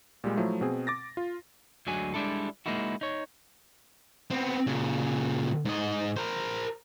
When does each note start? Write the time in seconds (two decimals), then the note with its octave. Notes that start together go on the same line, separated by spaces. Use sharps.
0.24 A#2 G3 G#3
0.37 F3 F#3 A3 E4
0.61 B2 C4 G#4
0.87 D6 A6 A#6
1.17 F4
1.87 D2 D3 F#3 G#3 F#4 G#5
2.14 G3 G#3 D4 E4 A4
2.66 G#3 A#3 D#4 E4 F#4
3.01 D#4 C#5
4.31 B3 C4
4.67 A#2 C#3
5.65 G#2 D#5
6.17 A#4 C5